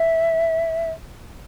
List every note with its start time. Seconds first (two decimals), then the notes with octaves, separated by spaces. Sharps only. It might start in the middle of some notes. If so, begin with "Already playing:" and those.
Already playing: E5